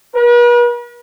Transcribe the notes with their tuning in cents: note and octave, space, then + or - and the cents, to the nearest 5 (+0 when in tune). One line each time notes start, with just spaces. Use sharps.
B4 -45